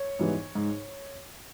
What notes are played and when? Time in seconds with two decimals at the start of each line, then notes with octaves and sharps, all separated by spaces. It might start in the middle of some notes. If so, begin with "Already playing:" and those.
Already playing: C#5
0.19 G#2 E3 G3 B3
0.55 G#2